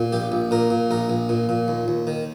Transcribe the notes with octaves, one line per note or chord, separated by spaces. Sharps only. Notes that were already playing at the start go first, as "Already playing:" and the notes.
Already playing: A#2
A#1 G4
A#1
A#2 A#4
A#2
A#1 A#4
A#1
A#2
A#2
D#2
D#2
D#3